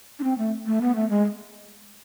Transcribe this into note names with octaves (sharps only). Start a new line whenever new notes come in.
D4
C4
A3
A3
B3
A3
G#3